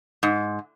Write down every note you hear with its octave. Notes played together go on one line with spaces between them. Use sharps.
G#2